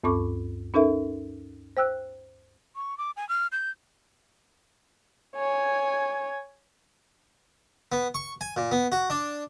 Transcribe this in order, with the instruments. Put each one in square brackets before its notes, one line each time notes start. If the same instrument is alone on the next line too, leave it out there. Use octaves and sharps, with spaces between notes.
[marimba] D2 G2 C4 A4 C#6 D6
C#4 D#4 A4 A#4 E5
C5 G5 E6 F#6
[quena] C#6
D6
G#5
F6
G6
[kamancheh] C#5 G#5
[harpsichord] B3
C#6
G#5
A#2
B3
F#4
D4